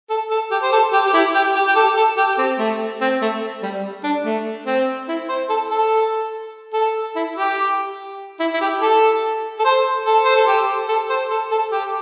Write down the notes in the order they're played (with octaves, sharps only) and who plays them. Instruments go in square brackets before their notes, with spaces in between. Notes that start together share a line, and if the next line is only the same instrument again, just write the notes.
[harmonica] A4
A4
G4
C5
A4
G4
G4
E4
G4
G4
G4
A4
A4
G4
C4
A3
C4
A3
G3
D4
A3
C4
E4
C5
A4
A4
A4
E4
G4
E4
E4
G4
A4
A4
C5
A4
C5
A4
G4
A4
C5
A4
A4
G4